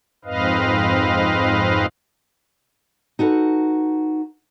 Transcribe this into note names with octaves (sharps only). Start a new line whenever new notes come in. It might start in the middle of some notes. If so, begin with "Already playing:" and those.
F2 G#2 C4 B4 D#5 F5
D#4 F#4 A4 B4